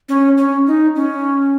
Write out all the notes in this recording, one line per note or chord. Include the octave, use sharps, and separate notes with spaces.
C#4
C#4
D#4
C#4